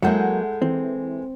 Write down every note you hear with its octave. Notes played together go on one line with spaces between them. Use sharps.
F#3 G#3 A#3 E4 G#4 A4 F#5 G6
E3 C4